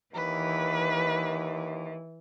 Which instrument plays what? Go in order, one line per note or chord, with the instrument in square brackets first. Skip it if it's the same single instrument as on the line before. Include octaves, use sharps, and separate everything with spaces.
[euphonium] D#2 [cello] E3 [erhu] B4